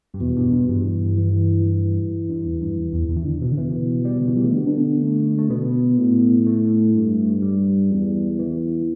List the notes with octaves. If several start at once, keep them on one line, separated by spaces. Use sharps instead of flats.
G2
E2 B2
G2
G2
G2 E3
E3
E3
G2
E2
G2
E2
E2
E2
E3
D3
B2
D3
B2 E3
G3
D3
E3
G3
A3
D3 B3
D4
B3
A3
A3
B2 B3
A2
A3
G2
G3
E2
E3